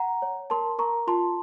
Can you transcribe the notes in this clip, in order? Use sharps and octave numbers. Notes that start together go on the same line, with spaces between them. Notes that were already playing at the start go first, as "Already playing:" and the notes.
Already playing: F#5 A#5
C#5
A#4 A5 C6
A#4 A#5 C#6
F4 A5 C6